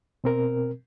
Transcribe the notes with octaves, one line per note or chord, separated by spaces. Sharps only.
B2 C4 A#4